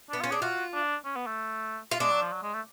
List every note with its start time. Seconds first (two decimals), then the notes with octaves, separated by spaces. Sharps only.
0.10 D4
0.13 B3
0.21 F4
0.24 C#4
0.31 D4 G#4
0.42 F4 F#4
0.74 D4
1.05 C#4
1.16 B3
1.27 A3
1.91 F4
2.00 G#3 D4
2.11 F#3
2.22 F3
2.33 F#3
2.43 G#3
2.54 A3